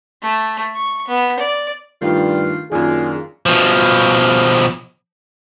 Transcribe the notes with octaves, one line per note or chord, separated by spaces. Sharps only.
A3
C#6
B3
D5
G2 D#3 A3 D4 F4
F#2 D#3 A#3 D4 F4 G#4
B2 F3